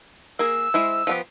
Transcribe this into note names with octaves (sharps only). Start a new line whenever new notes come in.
A#3 G#4 E6
G#3 E4 C5
F3 B3 G4